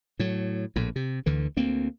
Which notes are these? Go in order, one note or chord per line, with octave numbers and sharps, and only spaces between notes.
A2 F#3
A#1 A2
C3
D2 D3 E3
D2 A#3 C4